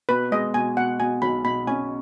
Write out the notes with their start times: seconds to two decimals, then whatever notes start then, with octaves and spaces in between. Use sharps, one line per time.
0.09 B2 B4
0.32 G#3 D#5
0.54 B2 G#5
0.77 B2 F#5
0.99 B2 G#5
1.22 B1 B5
1.44 B2 B5
1.67 C#4 G#5